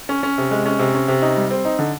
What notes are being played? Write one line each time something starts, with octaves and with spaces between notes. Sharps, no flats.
C#4
C#4
C3
G#3
C#4
C3
C#4
C3
D#4
G3
C4
D#4
D3